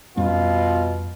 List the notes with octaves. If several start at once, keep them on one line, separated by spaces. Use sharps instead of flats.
F2 B2 G3 C#4 F4